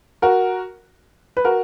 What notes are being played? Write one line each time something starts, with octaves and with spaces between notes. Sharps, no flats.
F#4 A#4
B4
F#4 A#4